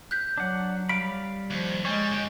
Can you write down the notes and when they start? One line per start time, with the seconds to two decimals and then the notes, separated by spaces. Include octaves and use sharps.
0.11 F#6 G6 B6
0.38 F#3 D4 F#5
0.89 G3 F5 B5 D7
1.50 D#2 F3
1.85 G3 G#3 C#5 G#5
2.12 D3 G4